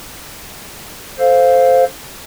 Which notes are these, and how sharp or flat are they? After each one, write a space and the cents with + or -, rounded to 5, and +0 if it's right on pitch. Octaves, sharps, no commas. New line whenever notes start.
A4 +0 C5 +0 F5 +0